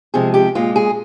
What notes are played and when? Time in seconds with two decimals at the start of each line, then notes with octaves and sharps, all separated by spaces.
0.14 C3 F3 G#3 G#4
0.34 G4
0.55 A#2 G#3 F4
0.76 G#4